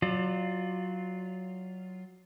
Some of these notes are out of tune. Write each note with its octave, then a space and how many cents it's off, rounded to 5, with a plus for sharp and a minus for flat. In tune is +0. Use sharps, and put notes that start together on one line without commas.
F#3 +0 F4 +0 D5 +30